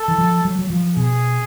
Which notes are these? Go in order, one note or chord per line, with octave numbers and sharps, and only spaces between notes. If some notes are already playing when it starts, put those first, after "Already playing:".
Already playing: A4
E3
F3
F#3
F#3
F3
B2 G#4